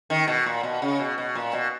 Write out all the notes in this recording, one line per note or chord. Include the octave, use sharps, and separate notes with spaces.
D#3
B2
A#2
B2
C#3
B2
B2
A#2
B2